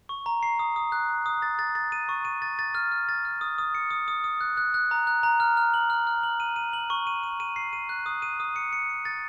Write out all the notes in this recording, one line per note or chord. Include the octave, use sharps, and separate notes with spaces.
C#6
A#5
C7
D#6
D#6
F#6
F#6
D#6
A6
A6
A6
D#7
C#6
D#7
A6
A6
F6
F6
A6
F6
D#6
D#6
C#7
D#6
D#6
D#6
F#6
F#6
F#6
A#5
F#6
A#5
F6
F6
F#7
F6
F6
F#7
D#7
D#7
F#7
C#6
D#7
D#7
D#7
C7
D#7
F#6
D#6
D#7
D#6
C#7
C#7
C#7
A6